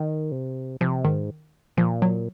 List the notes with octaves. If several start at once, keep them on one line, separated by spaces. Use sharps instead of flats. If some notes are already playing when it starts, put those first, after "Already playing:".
Already playing: D#3
C3
C3 F3
G#2 D#3
A#2 F3
F#3